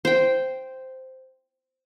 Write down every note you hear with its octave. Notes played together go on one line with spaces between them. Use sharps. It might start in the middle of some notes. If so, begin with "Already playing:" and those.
C5 G5